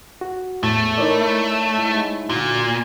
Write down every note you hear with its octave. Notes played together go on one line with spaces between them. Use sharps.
F#4
E2 A2 A3 A6
D#4 E4 A#4 C#5 D5
G#2 E4
A#2 D3 F#4